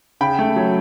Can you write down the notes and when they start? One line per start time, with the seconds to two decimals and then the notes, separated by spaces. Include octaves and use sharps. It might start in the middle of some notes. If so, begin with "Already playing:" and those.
0.21 C#3 G5 B5
0.39 A3
0.56 F#3